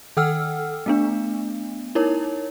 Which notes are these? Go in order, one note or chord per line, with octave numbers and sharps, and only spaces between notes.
D#3 A4 F#5 G5 E6 F6
A3 B3 D4
D#4 E4 A#4 C#5